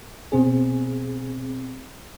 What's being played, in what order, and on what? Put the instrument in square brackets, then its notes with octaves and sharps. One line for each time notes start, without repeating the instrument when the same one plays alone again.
[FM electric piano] B2 C4 G#4